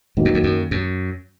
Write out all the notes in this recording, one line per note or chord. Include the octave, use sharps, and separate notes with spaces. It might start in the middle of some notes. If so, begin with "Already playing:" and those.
G#2 D#3 F#3 A#3
F#2
F2
F#2
F#2